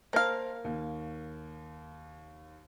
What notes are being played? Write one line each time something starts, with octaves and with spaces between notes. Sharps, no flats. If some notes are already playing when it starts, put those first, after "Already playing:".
A#3 A#4 C5 F5 A5
D#2